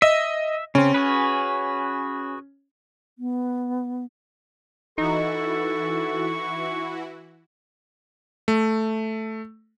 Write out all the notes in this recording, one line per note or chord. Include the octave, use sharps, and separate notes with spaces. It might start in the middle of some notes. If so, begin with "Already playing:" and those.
D#5 E5
C#3 C4 C#4
F#4 G#4 B4
B3
E3 D#4 E4 F#4 A4 C#6
A3